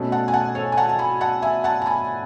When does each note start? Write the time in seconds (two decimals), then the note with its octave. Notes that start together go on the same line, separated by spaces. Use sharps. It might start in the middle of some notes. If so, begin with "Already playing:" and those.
Already playing: B2 A3 C#4
0.12 F#5 A5
0.28 G#5
0.34 F#5 A5
0.55 A4 C#5
0.72 G#5
0.77 F#5 A5
0.89 A5
0.99 G#5 B5
1.21 F#5 A5
1.42 E5 G#5
1.64 F#5 A5
1.82 A5
1.86 G#5 B5